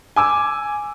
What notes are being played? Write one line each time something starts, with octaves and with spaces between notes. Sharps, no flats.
G#5 D6 E6